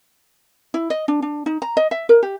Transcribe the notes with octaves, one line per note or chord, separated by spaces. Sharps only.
E4
D#5
D4
D4
D#4
A#5
D#5
E5
A#4
G4